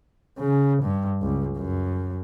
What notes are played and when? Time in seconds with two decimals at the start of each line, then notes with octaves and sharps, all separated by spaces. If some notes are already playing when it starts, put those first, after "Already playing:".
0.39 C#3
0.83 G2
1.22 C#2
1.57 F#2